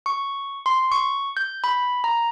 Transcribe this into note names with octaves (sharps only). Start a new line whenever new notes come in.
C#6
C6
C#6
G6
B5
A#5